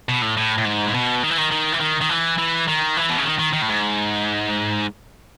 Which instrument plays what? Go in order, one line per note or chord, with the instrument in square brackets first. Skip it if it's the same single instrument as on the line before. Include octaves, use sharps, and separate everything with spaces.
[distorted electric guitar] B2
A2
A2
A2
G#2
A2
B2
D#3
E3
D#3
D#3
E3
D#3
D#3
E3
E3
D#3
E3
B2
C#3
D#3
D#3
D#3
A2
G#2